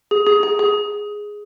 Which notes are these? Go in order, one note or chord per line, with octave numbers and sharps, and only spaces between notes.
G#4
G#4
G#4
G#4